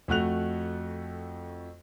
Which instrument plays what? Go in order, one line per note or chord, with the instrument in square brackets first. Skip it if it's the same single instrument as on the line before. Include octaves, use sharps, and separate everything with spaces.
[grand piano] F2 A3 F#4 F#6 F7